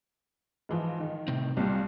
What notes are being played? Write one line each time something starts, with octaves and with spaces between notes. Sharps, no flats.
G#2 E3 F3
D#3
A2 C3 C4
C2 A#2 G3